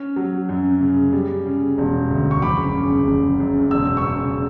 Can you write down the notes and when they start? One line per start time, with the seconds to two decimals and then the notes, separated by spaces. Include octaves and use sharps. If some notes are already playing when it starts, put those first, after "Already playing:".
Already playing: C#4
0.16 F#3
0.49 F#2
0.81 C#3
1.13 G3
1.46 C#3
1.78 E1
2.11 D2
2.31 C#6
2.42 F#1 B5 D6
2.74 C#3
3.07 F#1
3.40 F#2
3.71 E1 E6
3.97 C#6 E6
4.04 C#3